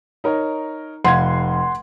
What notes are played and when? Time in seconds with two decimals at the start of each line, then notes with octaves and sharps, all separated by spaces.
0.24 D#4 A#4 C#5
1.04 F1 F5 F#5 C6 G#6